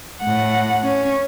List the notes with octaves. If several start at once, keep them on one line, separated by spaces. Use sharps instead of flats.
A2 F#5
C#4